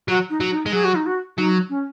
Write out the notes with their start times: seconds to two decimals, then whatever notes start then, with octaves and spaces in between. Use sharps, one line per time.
0.08 F#3 F#4
0.30 D#4
0.41 F#3
0.51 D#4
0.66 G#3
0.73 F#3 G#4
0.84 F#4
0.95 D#4
1.06 F#4
1.38 F#3 D#4
1.69 C#4